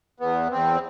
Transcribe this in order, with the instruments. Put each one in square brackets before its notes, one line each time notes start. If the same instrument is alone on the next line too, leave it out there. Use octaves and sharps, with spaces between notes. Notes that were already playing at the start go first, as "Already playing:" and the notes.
[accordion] E2 B3
E2 C4